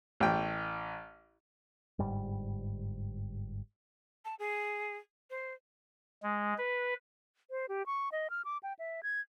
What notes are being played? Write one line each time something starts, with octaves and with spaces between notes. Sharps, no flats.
A1 G5
G1 G#2 G3
A5
G#4
C5
G#3
B4
C5
G4
C#6
D#5
F6
D6
G5
E5
G#6